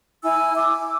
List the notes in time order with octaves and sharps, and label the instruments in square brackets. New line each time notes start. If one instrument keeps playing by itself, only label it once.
[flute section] E4 G#5 E6
D6 E6